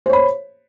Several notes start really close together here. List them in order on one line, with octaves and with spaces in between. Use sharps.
C5 C#5 B5